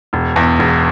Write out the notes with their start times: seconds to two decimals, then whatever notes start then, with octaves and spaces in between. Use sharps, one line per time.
0.13 E1
0.36 E2
0.59 E1